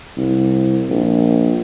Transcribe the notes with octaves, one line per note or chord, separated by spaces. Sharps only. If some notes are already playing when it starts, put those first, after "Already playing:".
C2
A#1